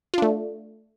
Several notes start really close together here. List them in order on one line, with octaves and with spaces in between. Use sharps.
F4 D4 A3